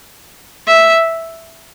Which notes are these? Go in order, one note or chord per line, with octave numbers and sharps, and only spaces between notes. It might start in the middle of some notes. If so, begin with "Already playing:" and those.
E5